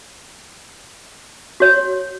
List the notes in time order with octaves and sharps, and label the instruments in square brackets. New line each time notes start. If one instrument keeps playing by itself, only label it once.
[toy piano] F#4 C#5